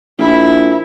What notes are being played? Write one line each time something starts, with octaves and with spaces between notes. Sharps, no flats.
A#1 E4